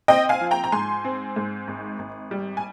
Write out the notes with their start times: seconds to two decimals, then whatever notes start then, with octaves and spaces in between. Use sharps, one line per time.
0.08 C4 D#5 G5
0.29 F5 G#5
0.41 F3
0.51 G5 A#5
0.64 A#5
0.72 G#2 G#5 C6
1.05 C4
1.36 G#2
1.68 G#1
1.99 G#1
2.31 G3
2.57 G#5